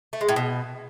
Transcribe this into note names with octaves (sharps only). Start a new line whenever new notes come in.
A3
G#3
A2
B2